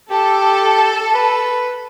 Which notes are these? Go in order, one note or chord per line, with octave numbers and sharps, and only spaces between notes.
G4 A4
B4